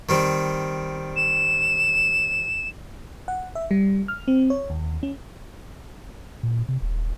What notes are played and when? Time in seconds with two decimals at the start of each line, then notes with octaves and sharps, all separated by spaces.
0.09 D#3 G3 C4
1.16 E7
3.28 F#5
3.55 E5
3.71 G3
4.08 F6
4.28 C4
4.50 C#5
4.70 D#2
5.03 C#4
6.43 A#2
6.69 C3
6.82 D#1